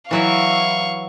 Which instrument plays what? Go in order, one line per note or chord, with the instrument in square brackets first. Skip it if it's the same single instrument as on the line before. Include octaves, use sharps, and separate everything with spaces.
[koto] E3 F#3 E4 [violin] F5 C#6